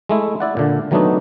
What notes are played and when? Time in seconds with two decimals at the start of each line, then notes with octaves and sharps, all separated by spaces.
0.09 G#3 A3 E4
0.40 E4 D5 F#5
0.57 A#2 D3 D4
0.91 D#3 F#3 A3 B3 D4 D#4